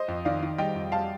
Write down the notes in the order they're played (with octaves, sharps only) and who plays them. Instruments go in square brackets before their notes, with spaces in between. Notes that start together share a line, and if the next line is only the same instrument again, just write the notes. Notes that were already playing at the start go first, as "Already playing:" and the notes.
Already playing: [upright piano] C5 D#5
[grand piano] F2
[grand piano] D#3 [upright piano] D5 F5
[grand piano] D#3
[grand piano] G3 [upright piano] D#5 G5
[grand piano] F2
[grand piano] G3 [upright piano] F5 A5